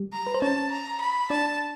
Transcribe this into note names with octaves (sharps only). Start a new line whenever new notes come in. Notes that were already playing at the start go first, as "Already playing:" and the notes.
Already playing: G3 G4
A#5
B4
C5
C#4 C#5 A5
A#5
B5
D4 D5 A5